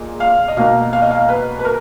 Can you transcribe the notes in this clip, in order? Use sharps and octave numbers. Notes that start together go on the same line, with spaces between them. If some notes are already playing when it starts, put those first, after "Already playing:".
Already playing: A#2 G#3 D#4
F5
D#5
B2 A#3 D#4 F5
F5
D#5
F5
B4
B4
A#4